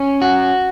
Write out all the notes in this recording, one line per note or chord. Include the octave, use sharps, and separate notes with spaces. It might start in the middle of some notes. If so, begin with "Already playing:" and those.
Already playing: C#4
F#4